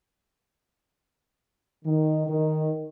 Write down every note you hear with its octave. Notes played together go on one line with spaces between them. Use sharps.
D#3
D#3